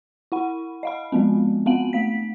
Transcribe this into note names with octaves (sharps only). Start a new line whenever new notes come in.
E4 F#5 B5
D#5 F5 B5
F3 G#3 B3 C4
B3 C4 F5 F#5 F#7
A3 F5 B6